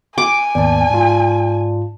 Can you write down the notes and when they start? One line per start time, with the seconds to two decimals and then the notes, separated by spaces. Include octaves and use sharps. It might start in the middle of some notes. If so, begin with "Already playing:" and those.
0.18 G#5 D6
0.55 G#1 D#2 B3 D5 A5
0.90 G#2 F4